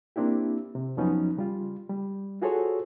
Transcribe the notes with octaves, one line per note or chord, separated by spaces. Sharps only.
A#3 C4 D4 E4 G4
C3
F2 F3 F#3 B3 C#4 D#4
C#3 G3 F4
G3
F4 F#4 G#4 A4 C5 C#5